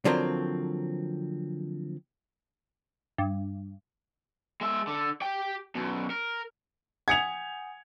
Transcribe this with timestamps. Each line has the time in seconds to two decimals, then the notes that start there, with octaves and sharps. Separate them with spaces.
0.05 D3 F3 F#3 A#3 C4
3.18 G2
4.61 G#3 E5
4.87 D3
5.22 G4 G5
5.75 F#2 B2
6.10 A#4
7.08 F#5 G#5 D#6 G#6 C#7 F7